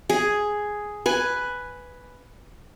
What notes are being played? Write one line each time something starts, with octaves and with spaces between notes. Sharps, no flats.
G#4
B4 G#5